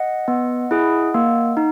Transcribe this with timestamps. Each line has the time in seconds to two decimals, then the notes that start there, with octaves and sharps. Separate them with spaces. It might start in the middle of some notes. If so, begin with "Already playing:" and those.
Already playing: D#5 F#5
0.28 B3
0.71 E4 G#4
1.14 A#3
1.57 D#4